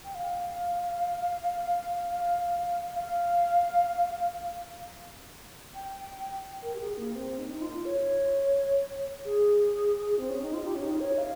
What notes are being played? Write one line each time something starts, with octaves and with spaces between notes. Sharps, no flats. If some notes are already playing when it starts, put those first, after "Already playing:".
G5
F5
F5
G5
A#4
G4
G#4
A#3
C4
D#4
D#4
F4
C#5
G#4
C4
C#4
D#4
F4
G4
C#4
D#4
C#5
F5